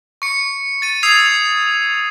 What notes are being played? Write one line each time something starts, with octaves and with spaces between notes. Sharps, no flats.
C#6 C#7
A6 D#7
D#6 E6 G#6 C7 F7